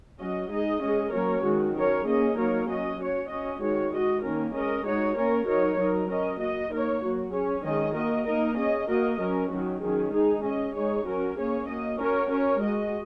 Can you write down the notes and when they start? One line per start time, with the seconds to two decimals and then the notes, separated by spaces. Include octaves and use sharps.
0.19 F#3 C#4 F#4 D#5
0.51 G#3 D#4 G#4 D#5
0.81 G#3 C#4 G#4 D#5
1.12 F#3 A#3 C#4 A#4 C#5
1.44 D#3 G#3 F#4
1.74 F#3 C#4 A#4 C#5
2.05 A#3 C#4 G#4 D#5
2.36 F#3 A#3 D#4 A#4 C#5
2.68 F#3 C#4 F#4 D#5
2.98 C#4 F#4 C#5
3.29 C#4 F#4 D#5
3.60 D#3 G#3 F#4 C#5
3.91 G#3 F#4 D#5
4.23 D#3 A#3 C#4 A#4
4.54 G#3 C#4 A#4 D#5
4.85 G#3 D#4 F#4 C#5
5.16 A#3 C#4 A#4 C#5
5.47 F#3 D#4 A#4 C#5
5.78 F#3 D#4 A#4
6.09 C#4 A#4 D#5
6.40 A#3 F#4 D#5
6.71 A#3 D#4 A#4 C#5
7.02 F#3 A#3 F#4
7.33 C#4 G#4 C#5
7.63 D#3 G#3 C#4 G#4 D#5
7.95 A#3 F#4 A#4 D#5
8.26 A#3 D#4 A#4 D#5
8.57 C#4 G#4 D#5
8.88 A#3 F#4 A#4 D#5
9.19 F#3 C#4 A#4
9.50 D#3 F#3 C#4 F#4
9.81 D#3 F#3 C#4 G#4
10.12 G#3 D#4 G#4
10.43 C#4 G#4 D#5
10.74 G#3 D#4 G#4 C#5
11.05 F#3 C#4 F#4 A#4
11.36 A#3 C#4 G#4 C#5
11.67 A#3 F#4 D#5
11.98 C#4 F#4 A#4 C#5
12.29 C#4 A#4 C#5
12.60 G#3 F#4 D#5